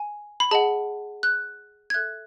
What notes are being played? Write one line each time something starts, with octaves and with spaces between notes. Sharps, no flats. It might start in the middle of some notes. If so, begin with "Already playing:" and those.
Already playing: G#5
B5
G#4 D#5 F#5 A5
F#6
G#6
A4 E5 F#6